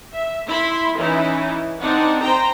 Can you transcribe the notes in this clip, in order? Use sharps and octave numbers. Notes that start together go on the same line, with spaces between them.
E5
E4 E5 B5 C6
E3 C#4 D#4 E4
C4 D4 D#4 F#5
C5 G5 A#5